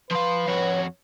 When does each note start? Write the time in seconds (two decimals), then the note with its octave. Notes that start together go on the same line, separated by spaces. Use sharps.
0.11 F3 B4 F5 C6
0.47 F2 F#4 C#5